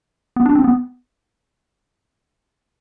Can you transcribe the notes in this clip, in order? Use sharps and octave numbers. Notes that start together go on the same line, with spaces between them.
B3
D4
C4
B3